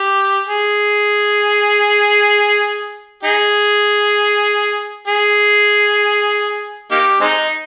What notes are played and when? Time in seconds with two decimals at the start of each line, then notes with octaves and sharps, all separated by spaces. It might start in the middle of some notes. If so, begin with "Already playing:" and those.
Already playing: G4
0.48 G#4
3.23 D#4 G#4
5.08 G#4
6.91 A#3 D#4 G4
7.21 G#3 C4 D#4